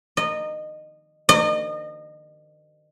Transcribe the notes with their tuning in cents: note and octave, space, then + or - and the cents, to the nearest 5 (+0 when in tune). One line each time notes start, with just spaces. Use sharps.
D#5 -20
D#5 -35